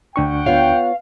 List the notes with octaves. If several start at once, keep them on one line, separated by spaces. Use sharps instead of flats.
D2 D4 F#5 G5 C#6
B3 F4 C#5 F5